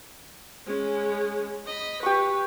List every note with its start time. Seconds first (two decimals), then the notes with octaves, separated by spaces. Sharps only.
0.66 G#3 C#4
1.66 D#5 B5
2.03 G4 B4 C#6